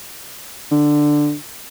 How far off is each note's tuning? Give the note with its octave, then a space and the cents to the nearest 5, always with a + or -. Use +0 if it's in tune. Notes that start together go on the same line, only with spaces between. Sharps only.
D3 +10